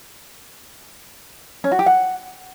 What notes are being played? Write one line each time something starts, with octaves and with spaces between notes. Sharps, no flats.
C#4
F#4
G4
F#5